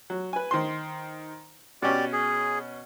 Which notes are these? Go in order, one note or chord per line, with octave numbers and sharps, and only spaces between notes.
F#3
B4 G#5
D#3 C5 C6
B2 C#4 G4 D5
G#4